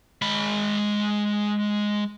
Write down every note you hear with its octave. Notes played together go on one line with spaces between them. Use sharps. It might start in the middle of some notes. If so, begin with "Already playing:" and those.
G#3 B5